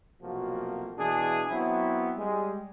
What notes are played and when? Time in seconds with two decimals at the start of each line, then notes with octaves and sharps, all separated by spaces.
0.22 B1 C3 F3 A#3 F#4
0.97 B2 E3 D4 G#4
1.50 F#3 B3 C4 E4
2.18 G3 G#3